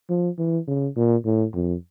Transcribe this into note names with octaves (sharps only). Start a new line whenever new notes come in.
F3
E3
C#3
A#2
A2
F2